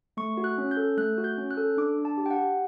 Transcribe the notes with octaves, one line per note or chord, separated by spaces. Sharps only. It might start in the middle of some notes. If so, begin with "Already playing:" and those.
A3 C#6
F#4
F#6
C#4
G6
A4
A3 F#6
F#4
G6
C#4
F#6
A4
D4 D6
D4
A5
G4
G5
F#5
G4